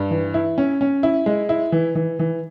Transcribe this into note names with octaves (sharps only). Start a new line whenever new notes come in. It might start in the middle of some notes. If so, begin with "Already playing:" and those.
Already playing: G2
E3
E4
C#4
C#4
E4
G#3
E4
E3
E3
E3